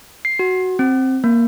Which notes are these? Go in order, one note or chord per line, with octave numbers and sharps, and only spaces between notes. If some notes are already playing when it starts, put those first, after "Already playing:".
C7
F#4
C4
A#3